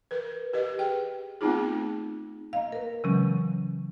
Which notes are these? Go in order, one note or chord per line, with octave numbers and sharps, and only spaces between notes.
A#4 B4
G4 B4 D#5
G#4 G5
A3 B3 C4 D#4 F4 G#4
A#3 D#5 F5
A#4 B4
C#3 E3 F#3 G#3 C#4